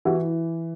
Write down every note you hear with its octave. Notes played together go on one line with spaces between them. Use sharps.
E3 E4 F#4